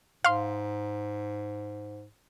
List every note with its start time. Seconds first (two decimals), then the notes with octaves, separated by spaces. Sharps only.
0.24 G#2 F5 C6